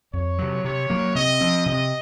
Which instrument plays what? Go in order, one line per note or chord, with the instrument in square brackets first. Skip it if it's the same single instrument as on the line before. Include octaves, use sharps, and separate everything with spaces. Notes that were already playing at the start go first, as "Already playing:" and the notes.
[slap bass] F2 [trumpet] C#5
[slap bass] C3 F#3
[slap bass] C3 [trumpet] C#5
[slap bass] F#3 A#3
[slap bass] C3 [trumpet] D#5
[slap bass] F3 C4
[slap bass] C3 [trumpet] D#5